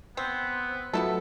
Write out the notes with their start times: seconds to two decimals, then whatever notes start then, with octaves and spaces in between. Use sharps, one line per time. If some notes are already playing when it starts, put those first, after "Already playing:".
0.17 B3 C4
0.93 F#3 A3 B3 E4 F4 A4